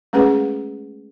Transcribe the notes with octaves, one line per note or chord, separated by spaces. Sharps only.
G#3 A3 C#4 G#4 B4 F#5